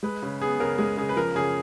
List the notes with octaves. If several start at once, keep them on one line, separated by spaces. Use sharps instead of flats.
G#3 B4
C#3
B3 G#4
C#3 A#4
G#3 G#4
C#3 G#4
B4
F3 A#4
C#3 G#4